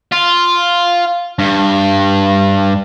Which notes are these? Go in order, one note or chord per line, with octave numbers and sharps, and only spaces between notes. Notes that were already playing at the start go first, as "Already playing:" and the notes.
F4
G2